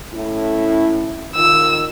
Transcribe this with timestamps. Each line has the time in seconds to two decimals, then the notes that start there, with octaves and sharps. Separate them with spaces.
0.14 A2 C#4 E4
1.36 D#3 F4 E6